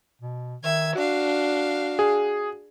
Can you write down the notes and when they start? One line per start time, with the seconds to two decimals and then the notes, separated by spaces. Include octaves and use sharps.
0.22 B2
0.63 D#3 E5 G#6
0.95 D4 F#4 F5
1.99 G#4